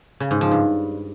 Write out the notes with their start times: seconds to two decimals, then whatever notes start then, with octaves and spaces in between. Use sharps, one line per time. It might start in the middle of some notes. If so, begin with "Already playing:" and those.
0.20 C#3
0.31 G#2
0.41 F3
0.51 G2